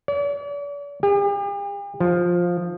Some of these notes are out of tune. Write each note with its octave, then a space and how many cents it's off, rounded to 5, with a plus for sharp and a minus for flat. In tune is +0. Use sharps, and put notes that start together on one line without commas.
D5 -45
G4 +45
F3 +10